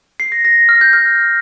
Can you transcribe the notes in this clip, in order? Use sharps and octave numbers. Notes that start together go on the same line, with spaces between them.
C7
A#6
A#6
F6
G6
F6